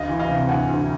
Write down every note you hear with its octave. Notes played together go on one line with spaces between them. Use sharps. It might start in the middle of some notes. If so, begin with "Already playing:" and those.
Already playing: D2 D#5 F5
E3
D#5 F5
C3
D2 F#5 G#5
D2